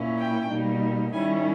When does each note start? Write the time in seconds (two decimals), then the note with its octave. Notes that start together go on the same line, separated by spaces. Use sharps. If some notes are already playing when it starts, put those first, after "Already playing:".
Already playing: A#2 A#3 C#4 E4
0.18 G5
0.49 B2 G3 A#3 D#4
1.13 D#3 G3 C#4 E4 G#5